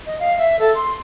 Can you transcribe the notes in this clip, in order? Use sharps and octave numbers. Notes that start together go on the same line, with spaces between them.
D#5
F5
E5
A4
C6